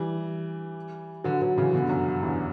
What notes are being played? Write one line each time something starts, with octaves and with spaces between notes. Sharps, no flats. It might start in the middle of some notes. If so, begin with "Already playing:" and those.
Already playing: E3 G3
D3 F#3
D3 F#3
C#3 E3
B2 D3
G2
F#2
E2 G2